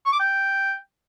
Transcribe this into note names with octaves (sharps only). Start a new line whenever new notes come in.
C#6
D6
G5